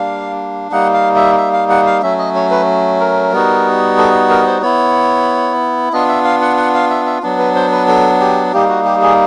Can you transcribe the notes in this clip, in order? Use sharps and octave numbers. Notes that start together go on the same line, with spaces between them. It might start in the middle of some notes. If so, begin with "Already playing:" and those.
Already playing: G3 A#3 D4 F5
G3 A#3 D#4 F#5
F5
E5
E5
F5
F#5
F5
F#3 A3 C#4 E5
D#5
C#5
B4
A#4
G3 B3 D#4 F#4
A4
A#4
C5
B3 E4 C#5
B3 D4 F4 D#5
E5
F5
F#5
F#5
F5
E5
E5
F#3 B3 D4
B4
C5
B4
A4
G4
G3 A#3 D#4 G4
F#4
G4
G#4